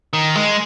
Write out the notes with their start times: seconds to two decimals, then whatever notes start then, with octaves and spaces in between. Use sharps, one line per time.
0.13 D#3
0.36 G#3